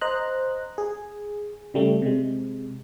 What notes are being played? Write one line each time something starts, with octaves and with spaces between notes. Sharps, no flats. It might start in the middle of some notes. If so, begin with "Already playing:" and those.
C5 D#5 A#5 F#6
G#4
C#3 G3 A3
C3 G#3